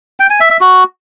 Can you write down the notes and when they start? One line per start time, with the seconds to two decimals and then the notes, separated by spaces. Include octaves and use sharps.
0.20 G5
0.30 G#5
0.40 E5
0.51 E5
0.61 F#4